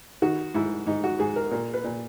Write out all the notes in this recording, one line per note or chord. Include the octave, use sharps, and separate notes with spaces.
D#3 F#4
G#2 E4
G#2 D#4
F#4
G#2 G#4
A#4
A#2 A#4
B4
A#2